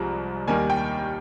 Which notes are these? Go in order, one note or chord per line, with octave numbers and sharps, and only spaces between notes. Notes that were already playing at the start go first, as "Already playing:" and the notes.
Already playing: C2 C3 F3 G#3 A#5
D#2 D#3 G3 A#3 G#5
G5